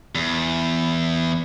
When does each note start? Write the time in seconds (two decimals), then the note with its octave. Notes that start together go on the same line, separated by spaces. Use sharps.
0.15 E2